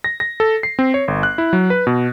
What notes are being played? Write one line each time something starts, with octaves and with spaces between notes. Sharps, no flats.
A#6
A#6
A4
C7
C4
C#5
G1
F#6
E4
F#3
B4
B2